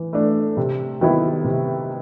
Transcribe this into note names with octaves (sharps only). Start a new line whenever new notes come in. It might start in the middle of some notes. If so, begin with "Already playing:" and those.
Already playing: E3
A3 D4
C3
D#3 F#3 B3 E4
C3